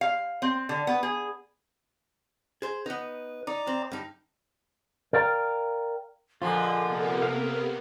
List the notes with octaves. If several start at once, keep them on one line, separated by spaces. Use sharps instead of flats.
F5
C4
D3
B3
G#4
G#4 C5
B3 D#4 B4
D#4 D5 A#5 D6
C4
G2 D#4
A#4 D5 F5 G5 A#5
A#2 D3 F3 F4 G#4 A4 D#5
C3 A#3 B3
A#4 F5